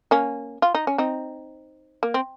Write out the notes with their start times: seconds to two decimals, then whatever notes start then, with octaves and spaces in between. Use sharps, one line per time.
0.11 A#3 C#4
0.62 F4
0.74 D#4
0.87 C#4
0.98 C4 D#4
2.03 A#3
2.14 C4